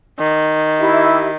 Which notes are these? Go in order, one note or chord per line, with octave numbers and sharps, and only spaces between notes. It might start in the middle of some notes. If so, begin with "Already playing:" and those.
D#3
E4 G4 E5